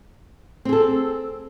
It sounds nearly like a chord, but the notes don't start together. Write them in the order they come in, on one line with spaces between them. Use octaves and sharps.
C4 G#4 A4